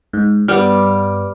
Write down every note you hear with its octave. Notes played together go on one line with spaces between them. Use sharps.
G#2
G2 G3 B3 D6 F6